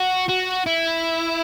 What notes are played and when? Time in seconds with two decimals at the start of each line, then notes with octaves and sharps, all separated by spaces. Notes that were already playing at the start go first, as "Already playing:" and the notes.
Already playing: F#4
0.29 F#4
0.66 E4